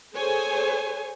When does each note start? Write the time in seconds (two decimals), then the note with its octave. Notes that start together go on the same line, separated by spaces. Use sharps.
0.15 G#4 A4 C5 C#5 G#5